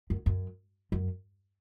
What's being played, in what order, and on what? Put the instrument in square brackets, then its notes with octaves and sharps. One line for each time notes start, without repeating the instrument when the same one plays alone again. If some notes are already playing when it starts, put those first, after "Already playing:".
[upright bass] F#2
F#2
F#2